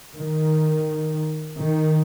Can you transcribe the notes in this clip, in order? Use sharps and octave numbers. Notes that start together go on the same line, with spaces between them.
D#3
D#3